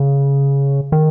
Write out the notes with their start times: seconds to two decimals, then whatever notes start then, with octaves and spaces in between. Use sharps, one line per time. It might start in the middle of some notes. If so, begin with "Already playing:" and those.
Already playing: C#3
0.92 D#3